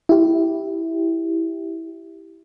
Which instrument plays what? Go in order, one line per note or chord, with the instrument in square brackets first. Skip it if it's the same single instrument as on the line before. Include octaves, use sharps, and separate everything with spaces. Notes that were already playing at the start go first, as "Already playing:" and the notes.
[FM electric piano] E4 G4